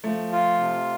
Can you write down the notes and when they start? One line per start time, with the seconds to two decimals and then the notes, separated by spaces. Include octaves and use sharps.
0.04 F3 A3
0.32 F4
0.59 C3